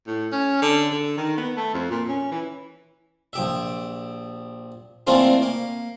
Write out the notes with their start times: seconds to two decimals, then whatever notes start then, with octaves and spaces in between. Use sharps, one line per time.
0.07 A2
0.32 C#4
0.62 D3
0.91 D3
1.17 D#3
1.37 B3
1.57 A3
1.74 F2
1.91 A#2
2.09 C#4
2.32 E3
3.33 A#1 G4 E5
5.07 E3 A3 A#3 C4 D4 F4
5.42 A#3